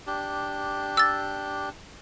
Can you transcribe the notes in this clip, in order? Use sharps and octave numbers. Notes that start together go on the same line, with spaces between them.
D4 G4
E6 A6